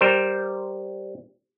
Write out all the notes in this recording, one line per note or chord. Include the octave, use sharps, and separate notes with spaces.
G3 A#4 C5